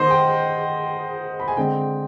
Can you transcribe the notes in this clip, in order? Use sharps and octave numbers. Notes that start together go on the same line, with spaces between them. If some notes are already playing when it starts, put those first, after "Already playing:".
Already playing: D#3 B3 C5 D#5
G5
B5
G#5
D3 G#3 C4 G5